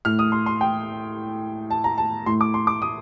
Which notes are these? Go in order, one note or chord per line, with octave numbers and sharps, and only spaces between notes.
A2 F6
D#6
C6
C6
G5
A5
A#5
A5
A2 C6
D6
C6
D6
D#6